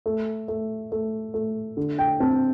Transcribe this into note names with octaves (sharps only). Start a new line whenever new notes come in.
A3
A3
A3
A3
D3
G5
C4 A5